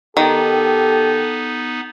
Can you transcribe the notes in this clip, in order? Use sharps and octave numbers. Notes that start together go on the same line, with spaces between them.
D#3 B3 D#4 G4 A4